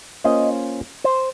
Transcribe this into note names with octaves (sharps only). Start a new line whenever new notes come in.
A#3 C#4 F4 C5 D#5
C5